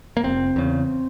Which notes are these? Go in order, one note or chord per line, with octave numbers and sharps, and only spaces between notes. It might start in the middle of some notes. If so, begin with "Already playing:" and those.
A#3
F1 C4
E2 C#3